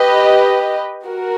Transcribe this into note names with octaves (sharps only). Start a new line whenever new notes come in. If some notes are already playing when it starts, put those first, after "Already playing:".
Already playing: G4 B4 D#5
F#4 A#4